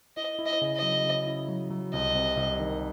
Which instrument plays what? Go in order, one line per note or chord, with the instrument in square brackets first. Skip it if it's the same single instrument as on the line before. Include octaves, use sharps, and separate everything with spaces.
[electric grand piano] E4 [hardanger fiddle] D#5
[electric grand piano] E4
[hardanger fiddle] D#5
[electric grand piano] C#3
[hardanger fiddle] D#5
[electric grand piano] F#3
C#3
E4
F#3
F#3
[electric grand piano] C2 [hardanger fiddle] D#5
[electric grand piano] C3
C2
D#3